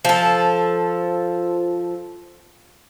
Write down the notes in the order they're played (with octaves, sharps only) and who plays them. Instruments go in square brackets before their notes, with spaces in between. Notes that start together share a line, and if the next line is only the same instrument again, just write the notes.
[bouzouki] F3 A4